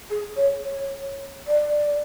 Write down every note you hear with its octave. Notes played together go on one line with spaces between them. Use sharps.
G#4
C#5
C#5
D5